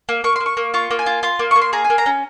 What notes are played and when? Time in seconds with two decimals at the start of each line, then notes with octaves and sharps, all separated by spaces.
0.09 A#3
0.24 A#3 C#6
0.36 A#3 C6
0.46 C#6
0.57 A#3
0.74 F4 C#6
0.91 A#3
0.99 G#5
1.06 F4
1.23 F4 C6
1.39 A#3
1.51 A#3 C#6
1.62 C6
1.73 G#4 A#5
1.85 G#5
1.90 A#3
1.98 A#5
2.06 C#4